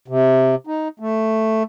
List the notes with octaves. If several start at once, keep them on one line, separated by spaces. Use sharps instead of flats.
C3
D#4
A3